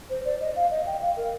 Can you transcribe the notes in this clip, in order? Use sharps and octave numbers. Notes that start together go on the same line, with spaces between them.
C5
D5
D#5
F5
D#5
G5
F5
A#4